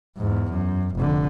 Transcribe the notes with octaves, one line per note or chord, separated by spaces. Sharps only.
E2 G#2
F#2
F1 D3